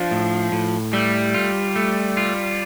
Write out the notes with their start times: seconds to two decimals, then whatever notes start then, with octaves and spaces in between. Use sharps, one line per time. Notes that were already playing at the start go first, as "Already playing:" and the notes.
Already playing: F3 D4
0.11 A2
0.52 A2
0.93 G3 A3
1.34 F4
1.76 A3
2.17 F4